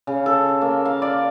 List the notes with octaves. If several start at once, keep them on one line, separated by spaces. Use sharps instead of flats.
C#3
A4
A#3
F5
D5